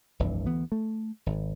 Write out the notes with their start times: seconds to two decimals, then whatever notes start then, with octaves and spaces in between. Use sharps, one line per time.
0.20 F1 C2 G2 E3
0.46 D2 E3 B3
0.72 A3
1.26 G#1